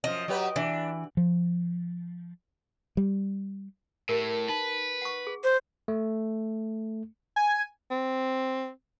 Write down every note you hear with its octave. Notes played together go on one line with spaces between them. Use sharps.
F#2 F3 D#5
F#3 G4 B4
E3 D4
F3
G3
A2 G4 A#4
D#4 B4
F#5 C#6
G#4
C5
A3
G#5
C4